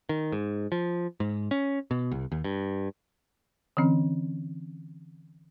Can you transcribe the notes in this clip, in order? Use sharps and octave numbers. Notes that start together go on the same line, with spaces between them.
D#3
G#2
F3
G#2
C#4
B2
C2
D#2
G2
D3 E3 C4 C#4